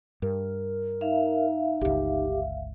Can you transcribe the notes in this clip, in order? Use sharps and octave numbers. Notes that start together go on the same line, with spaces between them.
G2 A#4
D#4 E5 F5
G1 C#2 G4